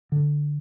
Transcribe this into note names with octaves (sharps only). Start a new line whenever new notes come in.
D3